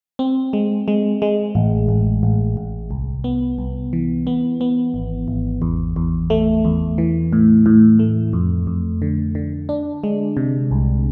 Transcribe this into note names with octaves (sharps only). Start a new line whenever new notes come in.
C4
G#3
G#3
G#3
A1
A1
A1
A1
C2
B3
C2
E3
B3
B3
G#1
G#1
E2
E2
A3
E2
E3
A2
A2
A3
F2
F2
D3
D3
D4
G#3
C3
C2